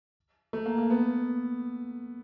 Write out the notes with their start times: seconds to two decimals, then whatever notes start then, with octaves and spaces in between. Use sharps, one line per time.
0.53 A3
0.66 A#3
0.78 A#3
0.90 B3